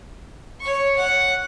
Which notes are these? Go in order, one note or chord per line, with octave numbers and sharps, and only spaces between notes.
C#5 C#6
F#5